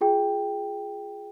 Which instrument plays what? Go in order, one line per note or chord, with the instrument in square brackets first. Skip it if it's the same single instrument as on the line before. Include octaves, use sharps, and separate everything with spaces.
[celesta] F4 G#4 G5